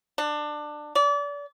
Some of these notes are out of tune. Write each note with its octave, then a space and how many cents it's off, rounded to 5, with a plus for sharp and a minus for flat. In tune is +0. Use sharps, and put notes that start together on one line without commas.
D4 +20
D5 -35